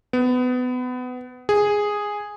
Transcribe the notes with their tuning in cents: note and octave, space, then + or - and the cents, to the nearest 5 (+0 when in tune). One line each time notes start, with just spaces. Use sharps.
B3 +25
G#4 -5